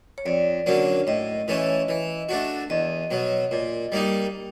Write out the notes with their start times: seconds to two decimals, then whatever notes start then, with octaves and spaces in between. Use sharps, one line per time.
0.18 C#5
0.26 F2 D5
0.66 D3 F#3 A#3 C#4
1.07 A2 D#5
1.48 E3 A3 C#4
1.88 E3
2.29 A3 D4 F#4
2.70 E2 D#5
3.11 B2 F#3
3.51 A#2
3.92 G3 A#3 D#4